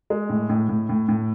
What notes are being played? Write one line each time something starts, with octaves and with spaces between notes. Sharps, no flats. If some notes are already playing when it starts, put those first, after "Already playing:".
G#3
A2
A2
A2
A2
A2